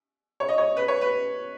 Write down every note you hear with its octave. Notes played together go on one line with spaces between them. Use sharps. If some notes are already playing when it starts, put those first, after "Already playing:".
C#5
D#5
C#5
B4
C#5
B4